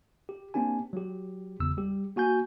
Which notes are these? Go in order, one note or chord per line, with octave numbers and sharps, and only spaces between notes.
G4
A#3 C4 D4 G4 G#5
F#3 G4
G1 E2 C#3 E6
G3 G4
A#3 F#4 G#5 G6